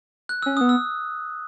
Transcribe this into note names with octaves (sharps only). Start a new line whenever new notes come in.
F#6
C#4 E6
B3 D#6
E6